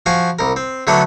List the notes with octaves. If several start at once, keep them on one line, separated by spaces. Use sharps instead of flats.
F3 F#4 F5 G#5
C2 A#4
C4
D3 F#3 A3 B3 D4